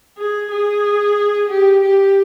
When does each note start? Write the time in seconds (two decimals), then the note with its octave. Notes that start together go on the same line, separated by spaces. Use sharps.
0.18 G#4
0.51 G#4
1.49 G4
1.82 G4